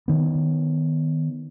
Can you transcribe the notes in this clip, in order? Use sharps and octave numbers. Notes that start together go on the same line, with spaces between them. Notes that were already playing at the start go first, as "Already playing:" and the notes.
D#3 B3